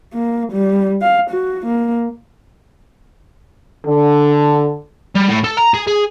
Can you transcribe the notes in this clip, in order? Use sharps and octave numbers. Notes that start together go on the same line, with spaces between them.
A#3
G3
F5
F#4
A#3
D3 A4
G3
A2
A4
A#5
G#4
G#4